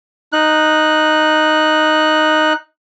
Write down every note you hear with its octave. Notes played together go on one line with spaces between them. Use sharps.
D#4 F#6